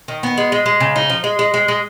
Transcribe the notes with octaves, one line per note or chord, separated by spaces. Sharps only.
D#3
B3
G#3
G#3
G#3
C#3
D#4
F3
G#3
G#3
G#3
G#3